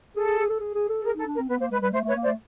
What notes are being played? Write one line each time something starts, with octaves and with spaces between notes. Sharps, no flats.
G#4 A4
G#4
G#4
A4
G#4
G#4
A4
A4
G#4 A#4
D#4
A4
D4
A#4
C4
B3 B4
A#3 C5
G#3 B4
G3 B4
A3 C5
A3
B4 C#5
A#3
C5 D5
A3